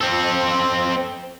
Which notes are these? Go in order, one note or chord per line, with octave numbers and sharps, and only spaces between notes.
C4 A4